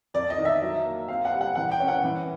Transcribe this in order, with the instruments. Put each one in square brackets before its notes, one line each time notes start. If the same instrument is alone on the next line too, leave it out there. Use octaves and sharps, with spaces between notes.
[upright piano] F2 D5
D#5
D#3
E5
F#3
A#3
C4 F5
F#5
G3
F#5
E3 F#5
G5
C#4
F#5
E3